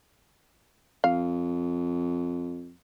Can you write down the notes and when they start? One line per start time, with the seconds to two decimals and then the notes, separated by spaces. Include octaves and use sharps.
1.04 F2 F5